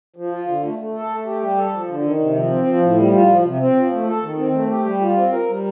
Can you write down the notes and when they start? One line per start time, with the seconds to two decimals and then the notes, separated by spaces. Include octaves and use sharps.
0.16 F3
0.32 F4
0.48 D3
0.63 A3
0.79 A3
0.94 A4
1.11 A3
1.26 G4
1.41 G3
1.57 A4
1.72 F3
1.88 D3
2.04 D#3
2.19 C3
2.35 F3
2.51 C4
2.67 F3
2.82 A2
2.98 G3
3.13 F4
3.29 F3
3.44 C3
3.60 C4
3.76 F3
3.91 A3
4.07 A4
4.22 D#3
4.38 C4
4.53 A3
4.69 G4
4.85 G3
5.01 F4
5.16 C4
5.32 A#4
5.48 G3